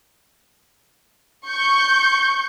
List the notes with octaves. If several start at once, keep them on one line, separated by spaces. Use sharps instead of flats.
C#6 G6